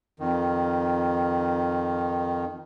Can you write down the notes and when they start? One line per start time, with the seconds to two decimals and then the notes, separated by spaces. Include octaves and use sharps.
0.20 F2 D#3